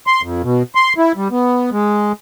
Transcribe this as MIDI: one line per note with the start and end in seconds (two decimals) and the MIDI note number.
0.07 0.22 84
0.22 0.42 41
0.43 0.63 47
0.75 0.93 84
0.98 1.12 64
1.16 1.28 55
1.31 1.70 59
1.72 2.12 56